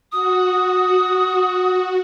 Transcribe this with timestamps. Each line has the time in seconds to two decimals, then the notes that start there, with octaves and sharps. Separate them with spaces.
0.12 F#4 D#6